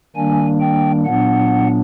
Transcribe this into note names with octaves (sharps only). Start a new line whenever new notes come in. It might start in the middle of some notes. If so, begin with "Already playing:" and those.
D#3 G3 A#3 D4 G#5
G5
A#2 F#3 B3 D4 F#5